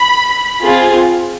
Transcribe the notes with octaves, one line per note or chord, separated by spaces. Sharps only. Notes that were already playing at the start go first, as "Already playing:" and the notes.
Already playing: B5
C4 F4 G#4